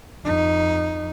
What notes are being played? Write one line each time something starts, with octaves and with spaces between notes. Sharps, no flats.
F2 D#4